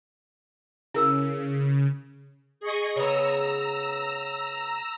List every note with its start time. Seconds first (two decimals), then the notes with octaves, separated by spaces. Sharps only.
0.94 C#3 E4 A#4 E6
2.60 G#4 D#5 C#6
2.96 C#3 B3 A#5 E6